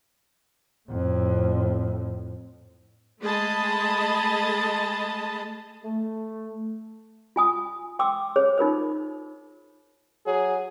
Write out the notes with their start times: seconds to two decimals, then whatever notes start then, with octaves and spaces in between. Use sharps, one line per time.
0.89 F2 A2
3.21 G#3 A3 G#4 D#5 A5 B5
5.83 A3
7.36 F4 G#5 D#6
7.99 G5 C6 D6 E6
8.36 G#4 C5 C#5
8.58 D#4 F4 A#4 C5
10.26 F#3 G#4